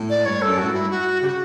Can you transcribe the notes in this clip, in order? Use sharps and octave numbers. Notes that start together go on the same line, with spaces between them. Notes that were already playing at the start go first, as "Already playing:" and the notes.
Already playing: A2
D5
G2 C#5
F#2 A4
A2 F#4
G2
E4
F#4
C#3 G4
F#4